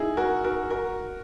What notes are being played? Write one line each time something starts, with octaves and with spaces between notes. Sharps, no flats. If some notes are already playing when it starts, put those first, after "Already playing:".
Already playing: D#4 E4 G#4
F#4 A#4
F#4 A#4
F#4 A#4